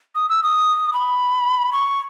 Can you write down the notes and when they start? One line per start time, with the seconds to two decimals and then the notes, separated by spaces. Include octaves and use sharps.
0.15 D#6
0.30 E6
0.43 D#6
0.94 B5
1.73 C#6